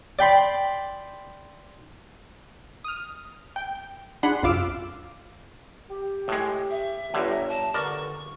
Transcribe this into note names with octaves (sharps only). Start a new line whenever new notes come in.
D5 G5 B5 C6
D#6 F6
G5
D4 G#4 F#5 B5 C6
C2 F#2 F4 F5 D6 E6
G4
A2 G#3
E5
G1 G2 D3 D4 C#5 A#5
A5
C#2 G2 D3 A#4 D5 C#6